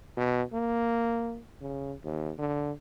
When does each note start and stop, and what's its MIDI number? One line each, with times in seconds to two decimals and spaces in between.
0.17 0.43 47
0.53 1.41 58
1.61 1.93 49
2.03 2.32 39
2.38 2.72 50